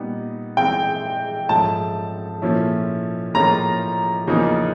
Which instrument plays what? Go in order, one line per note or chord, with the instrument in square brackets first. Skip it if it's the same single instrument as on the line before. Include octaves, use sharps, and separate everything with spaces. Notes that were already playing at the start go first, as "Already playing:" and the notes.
Already playing: [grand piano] A#2 G3 B3 D#4
[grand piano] E3 G#3 C4 E4 [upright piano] G5
[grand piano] G#2 F3 A3 C#4 [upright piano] A5
[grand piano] A#2 F3 A3 C#4 E4
[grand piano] A2 F3 A#3 C#4 F4 [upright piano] A#5
[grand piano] E2 C#3 F3 A#3 D#4